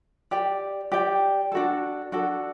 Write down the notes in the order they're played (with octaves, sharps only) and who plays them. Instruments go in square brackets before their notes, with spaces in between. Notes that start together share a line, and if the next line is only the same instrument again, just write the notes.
[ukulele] G4 D5 G5
G4 D5 G5
D4 F#4 A4
D4 F#4 A4